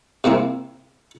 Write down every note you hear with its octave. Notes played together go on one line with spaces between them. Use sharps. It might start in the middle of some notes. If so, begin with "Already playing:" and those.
C3 A#3 C4 E4